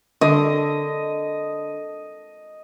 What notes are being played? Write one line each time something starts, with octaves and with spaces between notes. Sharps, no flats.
D3 D#5